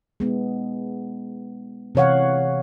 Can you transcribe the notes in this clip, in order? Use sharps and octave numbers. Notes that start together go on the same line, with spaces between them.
G#3 B3
C3 E3 C#5 F5 F#5